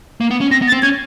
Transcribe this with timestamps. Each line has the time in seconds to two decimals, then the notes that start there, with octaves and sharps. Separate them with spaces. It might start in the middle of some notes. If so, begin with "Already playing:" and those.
0.20 A#3
0.31 B3
0.41 C#4
0.51 C4 A#6
0.62 B3
0.68 A6
0.72 C4
0.82 C#4 G#6